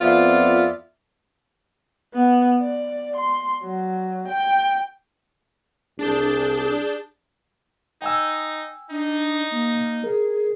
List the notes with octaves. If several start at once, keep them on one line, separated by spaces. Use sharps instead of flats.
F2 B3 C4 F4 D5 E5
B3
D5
C6
F#3
G5
C2 D4 G#4 A5 G6
D#4 G5 G#5 E6
D4 D#4
A#3
G#4 A#4